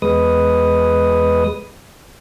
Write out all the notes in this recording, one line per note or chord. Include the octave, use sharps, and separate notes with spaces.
E2 G#3 B4 D#6